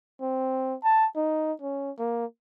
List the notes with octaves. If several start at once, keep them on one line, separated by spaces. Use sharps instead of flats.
C4
A5
D#4
C#4
A#3